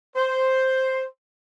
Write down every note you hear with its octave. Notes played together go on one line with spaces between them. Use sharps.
C5